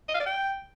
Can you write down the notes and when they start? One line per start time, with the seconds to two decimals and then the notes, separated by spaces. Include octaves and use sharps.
0.08 D#5
0.14 F5
0.20 D5
0.26 G5